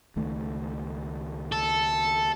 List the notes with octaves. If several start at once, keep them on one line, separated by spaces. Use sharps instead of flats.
C#2 D#3 A3
A4